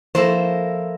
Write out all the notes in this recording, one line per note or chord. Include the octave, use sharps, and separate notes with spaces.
F3 A#3 E4 A4 C5 E6 A#6